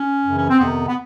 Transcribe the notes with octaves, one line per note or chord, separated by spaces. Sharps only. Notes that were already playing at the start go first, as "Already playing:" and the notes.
Already playing: C#4
F#2 C#3 E3
C#4
C4
F2 C3 D#3 B3
B3